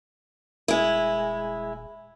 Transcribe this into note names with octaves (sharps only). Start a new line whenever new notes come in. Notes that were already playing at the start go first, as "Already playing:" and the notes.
D#1 G#3 E4